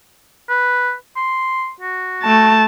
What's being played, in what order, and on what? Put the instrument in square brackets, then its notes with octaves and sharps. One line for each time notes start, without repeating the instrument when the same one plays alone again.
[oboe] B4
C6
F#4
[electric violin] A3 A5